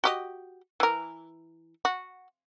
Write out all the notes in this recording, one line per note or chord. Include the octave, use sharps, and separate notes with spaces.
F#4 G4 D#5
E3 A#4
F#4